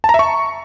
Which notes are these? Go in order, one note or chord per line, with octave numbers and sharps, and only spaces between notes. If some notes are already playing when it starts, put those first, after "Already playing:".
A5
A#5
E5
C#6